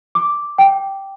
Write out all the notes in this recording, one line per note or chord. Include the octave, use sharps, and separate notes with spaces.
D6
G5